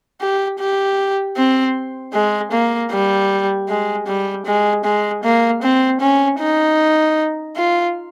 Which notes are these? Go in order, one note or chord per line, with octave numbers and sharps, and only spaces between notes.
G4
G4
C4
G#3
A#3
G3
G#3
G3
G#3
G#3
A#3
C4
C#4
D#4
F4